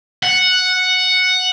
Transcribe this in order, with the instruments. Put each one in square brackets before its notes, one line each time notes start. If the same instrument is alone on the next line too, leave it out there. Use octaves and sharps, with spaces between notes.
[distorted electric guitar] F#5